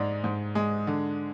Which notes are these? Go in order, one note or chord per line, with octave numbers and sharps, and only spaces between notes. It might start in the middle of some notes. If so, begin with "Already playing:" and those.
Already playing: G#2 G#3 D5
G#2
G#3
D3